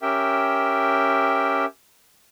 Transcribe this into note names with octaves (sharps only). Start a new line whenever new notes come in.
C#4 G4 A#4 E5 G5